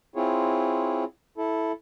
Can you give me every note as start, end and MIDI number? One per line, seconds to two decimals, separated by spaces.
0.16 1.04 60
0.16 1.04 64
0.16 1.04 65
0.16 1.04 68
0.16 1.04 73
1.38 1.72 64
1.38 1.72 69